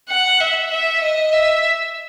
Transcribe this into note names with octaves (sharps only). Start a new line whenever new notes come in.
F#5
E5
E5
D#5
E5